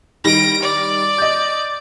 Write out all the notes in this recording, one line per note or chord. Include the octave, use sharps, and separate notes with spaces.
D#3 G3 A#6 D7
D5
D#5 G6